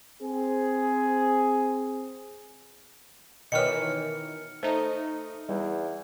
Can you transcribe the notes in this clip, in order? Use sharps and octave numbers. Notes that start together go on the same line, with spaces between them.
C4 G#4
B2 D#3 E3 C#5 D#5 F6 C#7
A3 D#4 C5
E2 G3